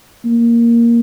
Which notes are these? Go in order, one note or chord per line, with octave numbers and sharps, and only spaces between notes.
A#3